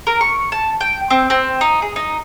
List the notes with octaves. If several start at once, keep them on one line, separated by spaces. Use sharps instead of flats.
A#4
C#6
A5
G5
C4
C4
D#4
G#4
D#4